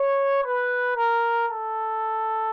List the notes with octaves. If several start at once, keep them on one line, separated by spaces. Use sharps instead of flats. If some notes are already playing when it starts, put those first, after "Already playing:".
Already playing: C#5
B4
A#4
A4